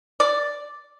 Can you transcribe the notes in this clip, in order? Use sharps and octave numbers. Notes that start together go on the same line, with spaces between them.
D5